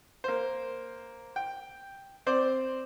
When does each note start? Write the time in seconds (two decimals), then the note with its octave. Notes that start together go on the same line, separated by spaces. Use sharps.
0.24 A#3 C5
1.36 G5
2.27 C4 C5 D5